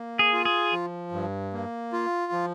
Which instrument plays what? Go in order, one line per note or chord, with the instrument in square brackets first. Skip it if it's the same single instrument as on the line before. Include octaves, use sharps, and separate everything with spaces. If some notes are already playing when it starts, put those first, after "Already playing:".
Already playing: [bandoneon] A#3
[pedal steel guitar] G#4
[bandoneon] F4
[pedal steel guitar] G#4
[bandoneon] F3
G2
A#3
F4
F3